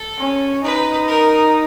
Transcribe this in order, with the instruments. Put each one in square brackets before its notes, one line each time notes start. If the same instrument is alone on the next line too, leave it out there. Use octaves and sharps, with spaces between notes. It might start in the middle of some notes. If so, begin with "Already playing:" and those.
Already playing: [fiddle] A4
[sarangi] C#4
[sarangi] D#4 [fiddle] B4
[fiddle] A#4